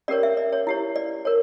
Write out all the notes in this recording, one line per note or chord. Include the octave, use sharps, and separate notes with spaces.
C#4 G4 A#4 C#5 D5
E5
D5
C#5
E4 G4 C#5
D5
A#4 C#5